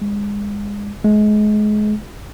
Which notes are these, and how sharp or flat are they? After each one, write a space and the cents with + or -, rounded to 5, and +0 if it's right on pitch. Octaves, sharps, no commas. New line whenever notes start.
G#3 -25
G#3 +30